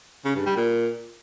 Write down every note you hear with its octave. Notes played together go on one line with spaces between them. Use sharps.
C#3
G2
G3
A#2